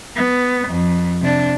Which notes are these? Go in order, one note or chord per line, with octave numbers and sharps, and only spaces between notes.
B3
F2
C3 D4